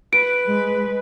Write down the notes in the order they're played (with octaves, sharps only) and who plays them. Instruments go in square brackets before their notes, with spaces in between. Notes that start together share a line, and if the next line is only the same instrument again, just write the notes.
[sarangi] B4 [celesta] D7
[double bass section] G#3